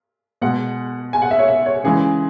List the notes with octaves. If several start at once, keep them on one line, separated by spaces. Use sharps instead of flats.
B2 G#3 F#5
G#5
F#5
E5
C#5
E5
C#5
C#3 E3 G#3 G#4